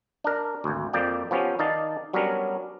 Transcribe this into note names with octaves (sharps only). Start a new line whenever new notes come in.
D4 A#4
G#1 D2
F2 A#3 D5 G5
F3 B3 C#4 G4
D#3 D#4 D5 F5 A5
F#3 G3 B3 C#4 D4 A#4